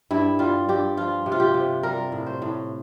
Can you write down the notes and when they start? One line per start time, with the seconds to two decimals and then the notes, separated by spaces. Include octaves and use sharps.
0.11 G2 E4
0.39 G3 F4
0.69 G2 G4
0.97 F3 F4
1.26 C3
1.32 F4
1.40 G4
1.54 C3
1.83 G3 A#4
2.12 A2
2.26 C5
2.42 A2